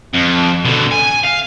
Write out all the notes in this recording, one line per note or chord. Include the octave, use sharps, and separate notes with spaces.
F2
B2 D3
G#5
F5